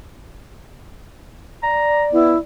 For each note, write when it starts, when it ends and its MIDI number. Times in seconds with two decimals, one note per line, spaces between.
1.63 2.42 74
1.63 2.05 82
2.13 2.34 59
2.13 2.38 64